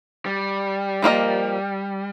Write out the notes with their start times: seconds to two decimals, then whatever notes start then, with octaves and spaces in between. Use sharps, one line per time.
0.26 G3
1.02 F3 A#3 F4 A#4 D#5